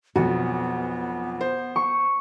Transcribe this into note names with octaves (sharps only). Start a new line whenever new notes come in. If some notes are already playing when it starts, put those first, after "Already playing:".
B1 F2 B3 F#4
C5
C#6